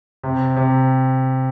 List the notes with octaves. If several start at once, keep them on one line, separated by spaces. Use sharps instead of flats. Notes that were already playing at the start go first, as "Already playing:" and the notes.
C3
C3